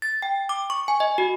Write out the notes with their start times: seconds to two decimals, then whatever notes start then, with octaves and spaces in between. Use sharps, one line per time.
0.02 A6
0.22 G5
0.49 D6
0.70 C#6
0.88 G#5
1.00 D#5
1.18 F#4